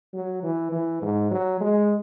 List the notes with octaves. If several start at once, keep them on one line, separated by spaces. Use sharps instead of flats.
F#3
E3
E3
G#2
F#3
G#3